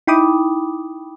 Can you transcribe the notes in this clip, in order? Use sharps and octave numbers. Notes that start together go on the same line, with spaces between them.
D#4 E4 G5 B5 D6 D#6